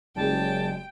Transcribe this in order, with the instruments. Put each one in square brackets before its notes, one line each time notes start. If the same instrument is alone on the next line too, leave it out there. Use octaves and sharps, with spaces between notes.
[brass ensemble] F#1 [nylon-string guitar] G3 G#3 [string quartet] G5 [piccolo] A5